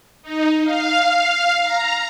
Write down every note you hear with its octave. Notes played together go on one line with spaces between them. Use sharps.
D#4
F5
A#5